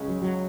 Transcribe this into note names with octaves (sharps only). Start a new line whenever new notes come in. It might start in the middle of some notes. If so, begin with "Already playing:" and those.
Already playing: C#2 C#3 G#3 C#4
F#3
F#3